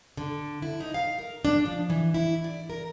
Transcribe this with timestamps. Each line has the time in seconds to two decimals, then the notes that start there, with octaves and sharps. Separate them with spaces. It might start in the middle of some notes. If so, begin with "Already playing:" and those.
0.17 D3
0.62 E4
0.80 D#4
0.94 F5
1.19 A#4
1.45 D4
1.65 F3
1.90 E3
2.14 E4
2.44 D5
2.70 A#4